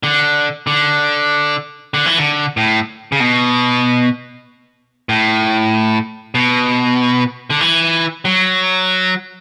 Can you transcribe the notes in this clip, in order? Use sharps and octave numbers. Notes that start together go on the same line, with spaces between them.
D3
D3
D3
E3
D3
A2
C#3
B2
A2
B2
D3
E3
F#3